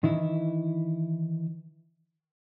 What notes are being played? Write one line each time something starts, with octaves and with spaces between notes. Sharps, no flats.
D#3 E3 E4